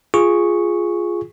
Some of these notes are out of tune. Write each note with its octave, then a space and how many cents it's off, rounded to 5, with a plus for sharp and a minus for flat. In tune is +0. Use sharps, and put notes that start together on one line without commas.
F4 +0 G#4 +0 C#6 +0